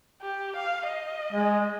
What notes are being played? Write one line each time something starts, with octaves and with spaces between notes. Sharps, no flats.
G4
F5
D#5
G#3